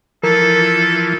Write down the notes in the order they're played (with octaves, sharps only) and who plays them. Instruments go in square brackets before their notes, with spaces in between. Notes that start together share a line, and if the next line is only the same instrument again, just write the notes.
[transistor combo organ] E3 F3 [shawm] A4 [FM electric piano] A#4